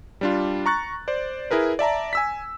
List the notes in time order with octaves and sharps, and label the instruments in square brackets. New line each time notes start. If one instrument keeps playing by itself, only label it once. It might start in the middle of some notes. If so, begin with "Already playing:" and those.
[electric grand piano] G3 D4 F4
A#5 C#6 F#6 A6
C5 D5
E4 G#4 A#4 B4
D5 E5 A5 A#5
G#5 E6 B6